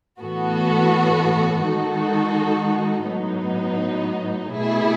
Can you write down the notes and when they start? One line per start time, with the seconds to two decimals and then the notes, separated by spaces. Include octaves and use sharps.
0.20 A2 E3 B3 F#4 A4
1.64 D#3 G#3 D#4 F#4 A4
3.08 A2 F#3 B3 D#4
4.53 B2 A3 E4 G#4